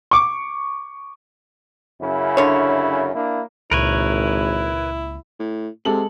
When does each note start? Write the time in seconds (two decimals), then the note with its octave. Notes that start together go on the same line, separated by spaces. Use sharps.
0.11 C#6 D6
2.01 F#2 C#3 E4
2.37 D3 C#5
3.14 A#3 D4 E4
3.71 G#1 C#2 A#2 E4 A#4 B4 C#5
5.40 A2
5.85 C3 G#3 A4 F#7